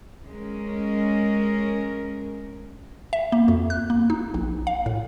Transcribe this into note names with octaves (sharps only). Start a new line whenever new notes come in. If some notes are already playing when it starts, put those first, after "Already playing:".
G#3 C#4 A#4
E5
A#3
F2
F#6
A#3
D#4
A#1
F5
A2